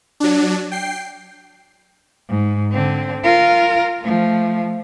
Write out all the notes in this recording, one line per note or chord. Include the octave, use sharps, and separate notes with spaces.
F#3 D4
G5 C7
G#2
D3 C4
F4 A#4
F3 A3